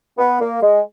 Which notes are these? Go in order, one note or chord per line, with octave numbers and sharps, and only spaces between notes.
B3
A#3
G#3